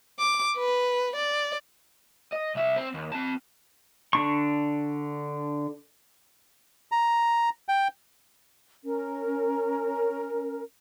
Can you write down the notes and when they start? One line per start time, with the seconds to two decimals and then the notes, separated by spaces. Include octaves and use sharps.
0.19 D6
0.57 B4
1.16 D5
2.32 D#5
2.55 C2 E5
2.77 C4
2.94 D#2
3.12 C4 A5
4.13 D3 D4 C#6
6.92 A#5
7.69 G5
8.85 C#4 A#4